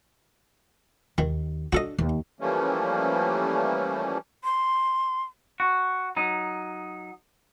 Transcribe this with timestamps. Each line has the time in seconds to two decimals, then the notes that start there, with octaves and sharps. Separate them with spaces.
1.18 D#2 D#3
1.73 D4 F#4 A4 D#5
1.99 D#2
2.41 E3 F3 G3 A3 A#3 C#4
4.44 C6
5.60 F#4
6.17 F#3 D#4